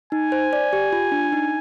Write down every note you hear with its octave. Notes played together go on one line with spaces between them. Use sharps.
D#4 G#5
C5
D5
G4
F4
D4
D#4